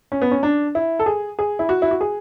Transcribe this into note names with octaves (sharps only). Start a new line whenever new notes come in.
C#4
B3
C#4
D4
E4
A4
G#4
G#4
E4
F#4
E4
F#4
G#4